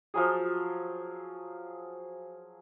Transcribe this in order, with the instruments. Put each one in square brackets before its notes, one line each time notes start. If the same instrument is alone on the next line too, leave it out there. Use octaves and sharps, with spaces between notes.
[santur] F3 F#3 G#4